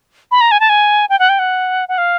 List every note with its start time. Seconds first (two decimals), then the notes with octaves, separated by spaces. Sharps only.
0.31 B5
0.41 A#5
0.51 G#5
0.60 A5
0.69 G#5
1.09 G5
1.19 F#5
1.29 G5
1.39 F#5
1.88 F#5
1.98 F5